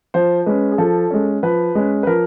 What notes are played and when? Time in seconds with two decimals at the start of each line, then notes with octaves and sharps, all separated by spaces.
0.14 F3 C5
0.46 G#3 C#4 B4
0.72 G#4
0.78 F3 A4
1.10 G#3 C#4
1.43 F3 B4
1.75 G#3 C#4
2.03 B4
2.07 F3 A#4